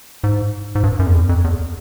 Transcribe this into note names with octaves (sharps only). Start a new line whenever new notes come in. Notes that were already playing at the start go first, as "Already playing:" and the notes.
G#2
G#2
G2
F#2
E2
F2
F2
E2